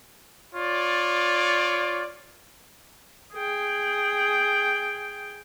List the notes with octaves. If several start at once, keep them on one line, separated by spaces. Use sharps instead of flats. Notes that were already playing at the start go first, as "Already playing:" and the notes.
F4 C#5 D5
G#4 G5